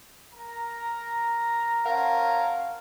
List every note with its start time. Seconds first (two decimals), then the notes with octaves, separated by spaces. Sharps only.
0.34 A#4 A#5
1.86 C#4 A#4 C5 F5 F#5 A5